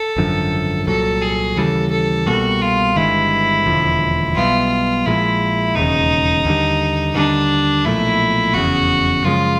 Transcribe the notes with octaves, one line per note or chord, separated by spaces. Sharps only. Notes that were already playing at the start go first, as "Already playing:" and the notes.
Already playing: A4
G#1 F#2 D3 F3
C2 A#2 F#3 A4
G#4
D#2 C#3 E3 G3 A4
A4
C2 B2 G3 A#3 F#4
F4
G1 G2 D#3 G#3 E4
E1 D#2 D3 F3
B1 B2 G3 B3 F4
A#1 A#2 F3 G#3 E4
E1 D#2 C#3 D#4
D#2 D3 G3
D#2 D3 G3 D4
B1 A#2 F3 A3 E4
F1 E2 C#3 F#4
F#2 C#3 F3 G#3 F4